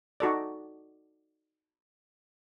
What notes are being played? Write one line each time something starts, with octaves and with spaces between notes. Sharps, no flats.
D#4 F#4 A4 D5